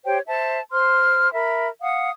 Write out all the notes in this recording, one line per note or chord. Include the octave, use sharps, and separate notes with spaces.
G4 C5 C#5 G5
C5 E5 A5
C5 C6 F6
A#4 E5 B5
F5 F#5 D#6